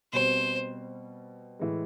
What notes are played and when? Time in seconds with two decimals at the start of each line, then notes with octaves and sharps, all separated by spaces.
0.13 B2 G3 C4 C5
1.59 A2 E3 G#3